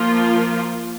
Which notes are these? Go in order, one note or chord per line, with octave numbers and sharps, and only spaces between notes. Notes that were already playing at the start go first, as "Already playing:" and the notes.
Already playing: F3 A#3 F4